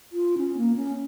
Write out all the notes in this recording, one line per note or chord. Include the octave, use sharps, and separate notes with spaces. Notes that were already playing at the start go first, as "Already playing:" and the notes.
F4
C#4
A#3
C#4